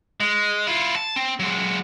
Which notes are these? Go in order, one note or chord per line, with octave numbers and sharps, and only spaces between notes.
G#3
E4 F4
A5
C4
F#3 G#3